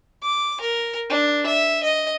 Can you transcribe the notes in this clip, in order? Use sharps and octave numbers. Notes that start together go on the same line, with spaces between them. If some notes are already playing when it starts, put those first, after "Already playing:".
D6
A#4
D4
E5
D#5